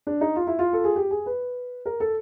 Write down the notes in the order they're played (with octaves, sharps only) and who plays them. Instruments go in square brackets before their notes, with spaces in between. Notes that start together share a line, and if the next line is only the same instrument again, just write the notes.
[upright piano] D4
D#4
F4
E4
F4
A4
G#4
G4
G#4
B4
A#4
A4